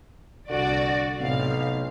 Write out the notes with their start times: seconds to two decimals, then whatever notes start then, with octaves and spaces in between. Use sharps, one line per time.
0.50 C2 D3 F#4 D5
1.20 B1 A2 C3 C4 F5